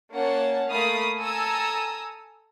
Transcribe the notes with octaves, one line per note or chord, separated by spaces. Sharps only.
A#3 C#4 C#5 F#5 A5
A3 A#3 F5 B5 D#6
A4 G#5 A#5 D#6 E6